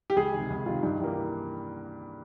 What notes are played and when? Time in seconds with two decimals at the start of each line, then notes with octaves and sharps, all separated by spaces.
0.10 G4
0.16 C#2 G#4
0.33 C3 D#3
0.50 C#2
0.66 C3 D#3 F4
0.83 G2 D#4
1.00 E3 G3 A#3